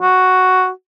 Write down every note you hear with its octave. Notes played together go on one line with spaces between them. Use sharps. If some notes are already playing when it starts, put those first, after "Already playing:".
F#4